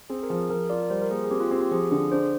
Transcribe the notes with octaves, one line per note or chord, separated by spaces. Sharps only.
C4 G#4
A#4
F3 G#4
F3 A#4
F4 D5
A#4
G3 C5
A#4
A#3 G#4
G#4
C4 G4
F4
C4 G4
G4
F3 G#4
D3 G#4
D4 C5